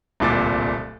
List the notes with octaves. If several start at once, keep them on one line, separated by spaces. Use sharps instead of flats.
D1 C2 A#2 D6 A6